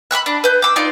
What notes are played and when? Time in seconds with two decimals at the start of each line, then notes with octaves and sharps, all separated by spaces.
0.11 B5 C#6 E6 F#6
0.26 D4
0.44 B4 G6
0.62 D6 E6
0.76 D#4 F4 D5